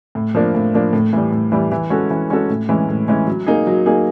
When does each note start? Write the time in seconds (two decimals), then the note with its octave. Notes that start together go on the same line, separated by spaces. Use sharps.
0.15 A2
0.35 F3 A#3 D4
0.55 A2
0.74 F3 A#3 D4
0.93 A2
1.13 E3 G3
1.32 A2
1.52 E3 G3
1.72 E3
1.90 G#3 C#4 F#4 A4
2.10 E3
2.30 G#3 C#4 F#4 A4
2.49 A2
2.69 E3 G#3 C#4
2.88 A2
3.08 E3 G#3 C#4
3.27 F#3
3.46 A#3 D#4 G#4
3.67 F#3
3.86 A#3 D#4 G#4